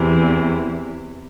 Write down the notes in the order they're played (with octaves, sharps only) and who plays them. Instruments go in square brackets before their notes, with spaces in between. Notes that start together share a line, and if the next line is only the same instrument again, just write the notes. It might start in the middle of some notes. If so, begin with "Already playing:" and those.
Already playing: [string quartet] E2 C3 E3